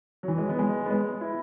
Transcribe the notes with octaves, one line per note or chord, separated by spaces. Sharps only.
F#3
E3
G#3
B3
G#3
B3
G#3
E4